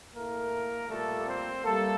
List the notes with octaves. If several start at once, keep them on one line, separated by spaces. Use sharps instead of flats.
A2 A3 A#3 A#4
A#2 G3 A3 A#3 A4
C4 C5
G3 A3 A#3 A4